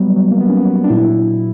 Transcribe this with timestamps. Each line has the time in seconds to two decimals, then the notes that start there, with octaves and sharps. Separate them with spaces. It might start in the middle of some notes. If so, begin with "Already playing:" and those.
Already playing: F#3 G3 B3
0.16 F#3
0.31 A#3
0.40 F#3 B3
0.49 C#4
0.57 B3
0.65 F#3
0.84 D4
0.90 A#2 E4